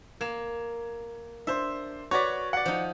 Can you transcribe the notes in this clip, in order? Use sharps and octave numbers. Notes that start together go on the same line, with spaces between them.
A#3 G#6 E7
D4 C5 E5
F#4 B4 C#5 D5 G#6 B6
D5 F#5
F3 D#4